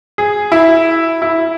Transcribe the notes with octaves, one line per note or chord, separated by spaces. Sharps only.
G#4
E4
E4